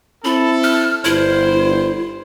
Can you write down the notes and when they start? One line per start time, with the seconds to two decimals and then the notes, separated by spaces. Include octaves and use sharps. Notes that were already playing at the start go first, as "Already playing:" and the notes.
0.25 C4 E4 A4 B5
0.64 F6
1.05 G1 E4 C5